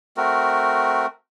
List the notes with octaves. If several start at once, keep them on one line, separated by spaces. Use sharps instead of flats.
A3 C4 F#4 A#4